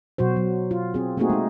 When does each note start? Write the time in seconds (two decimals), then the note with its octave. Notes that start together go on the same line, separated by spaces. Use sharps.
0.18 B2 F#3 F#4 C5
0.36 F#3
0.71 F4
0.94 C4 G#4
1.17 A3 A#3 C4 D#4 F#4 G#4
1.30 G#3 D#4